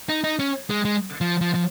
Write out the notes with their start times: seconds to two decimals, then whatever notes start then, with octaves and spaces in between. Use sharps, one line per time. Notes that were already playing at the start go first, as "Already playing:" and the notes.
0.09 D#4
0.24 D#4
0.39 C#4
0.70 G#3
0.85 G#3
1.21 F3
1.41 F3
1.55 F3